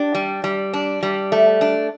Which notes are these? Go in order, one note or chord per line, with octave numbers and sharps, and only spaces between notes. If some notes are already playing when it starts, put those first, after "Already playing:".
Already playing: D4 G4
G3
G3
D4
G3
A3
D4